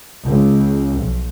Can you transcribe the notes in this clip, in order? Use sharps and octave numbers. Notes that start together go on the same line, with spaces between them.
C#2
B1